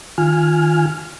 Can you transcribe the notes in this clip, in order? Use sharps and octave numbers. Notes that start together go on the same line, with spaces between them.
D#3 F4 G#5 F6